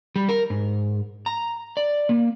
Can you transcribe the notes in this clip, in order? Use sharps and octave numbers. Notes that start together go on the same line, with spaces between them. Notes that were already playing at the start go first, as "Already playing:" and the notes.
G3
A#4
G#2
A#5
D5
A#3